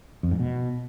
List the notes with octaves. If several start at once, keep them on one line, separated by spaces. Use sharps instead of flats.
F2
G#2
B2